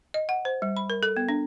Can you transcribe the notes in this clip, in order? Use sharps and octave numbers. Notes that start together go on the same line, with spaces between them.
D#5
F#5
C5
G3
B5
A#4
A4
B3
D4